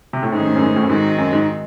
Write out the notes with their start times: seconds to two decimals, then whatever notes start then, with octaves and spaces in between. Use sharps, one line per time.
0.13 C3
0.23 A2
0.32 G#2 D#3 A3 C#4 G#4 C5
0.47 G#2
0.56 F#2
0.61 G#2
0.76 A2
0.83 F#2
0.89 G#2 D#3 G#3 C4 F#4
1.18 F#2
1.33 G#2